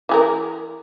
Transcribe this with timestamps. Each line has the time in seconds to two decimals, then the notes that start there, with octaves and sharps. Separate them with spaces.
0.09 E3 G#4 A#4